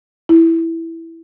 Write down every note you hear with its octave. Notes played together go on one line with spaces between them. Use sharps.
E4